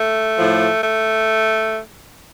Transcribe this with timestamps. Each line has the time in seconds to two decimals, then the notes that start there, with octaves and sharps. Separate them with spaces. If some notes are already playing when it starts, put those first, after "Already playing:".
Already playing: A3
0.37 A2 F3
0.83 A3